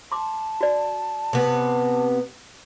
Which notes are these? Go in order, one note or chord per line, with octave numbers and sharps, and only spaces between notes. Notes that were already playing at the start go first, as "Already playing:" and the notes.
A5 C6 D6
F#4 D5
C3 B3